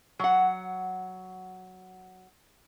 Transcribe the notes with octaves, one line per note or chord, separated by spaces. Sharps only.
F#3 F#5